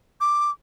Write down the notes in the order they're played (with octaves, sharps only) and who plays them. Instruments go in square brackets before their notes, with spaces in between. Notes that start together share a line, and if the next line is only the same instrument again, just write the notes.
[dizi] D6